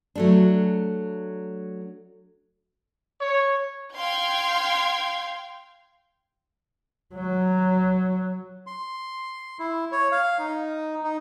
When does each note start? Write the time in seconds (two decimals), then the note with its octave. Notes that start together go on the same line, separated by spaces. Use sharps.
0.15 F#3 A3 D4
3.21 C#5
3.97 F5 G5 C6 G#6
7.15 F#3
8.67 C6
9.59 E4
9.92 C#5
10.12 F5
10.39 D#4
11.03 D#4